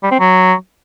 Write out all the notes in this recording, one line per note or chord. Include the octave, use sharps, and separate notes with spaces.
G3
C4
F#3